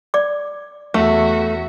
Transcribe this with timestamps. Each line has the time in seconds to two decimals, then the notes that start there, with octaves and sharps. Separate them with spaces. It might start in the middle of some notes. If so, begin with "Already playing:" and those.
0.14 D5 D6
0.94 E2 A3 F#4 E5